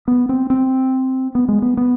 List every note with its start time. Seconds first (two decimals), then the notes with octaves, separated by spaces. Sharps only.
0.08 B3
0.29 C4
0.50 C4
1.35 B3
1.48 G#3
1.62 B3
1.77 B3